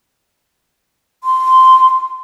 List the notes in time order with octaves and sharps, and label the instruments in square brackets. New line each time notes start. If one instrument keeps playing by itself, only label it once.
[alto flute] C6